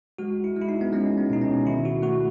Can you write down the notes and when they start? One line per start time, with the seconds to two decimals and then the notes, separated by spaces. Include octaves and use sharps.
0.19 G#3 F#4
0.44 E4
0.56 G#3
0.62 E4
0.69 D#4
0.81 B3
0.93 G#3 C#4
1.18 B3
1.30 B2 D#4
1.41 C#4
1.66 D#3 E4
1.85 F#4
2.02 A3 F#4